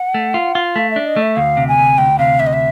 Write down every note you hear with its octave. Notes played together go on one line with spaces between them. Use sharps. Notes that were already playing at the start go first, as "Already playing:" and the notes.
Already playing: F#5
A3
F4
F4
A3 F5
E5
D4
D#5
A3
E5
D2 F5
C3
G#5
D2
D2 G5
C3 F5
D2 E5
D#5
E5